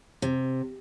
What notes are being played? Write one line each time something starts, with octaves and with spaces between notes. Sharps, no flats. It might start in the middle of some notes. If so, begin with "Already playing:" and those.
C3